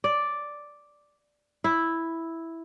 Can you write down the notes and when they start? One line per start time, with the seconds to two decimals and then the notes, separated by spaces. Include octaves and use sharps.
0.04 D5
1.64 E4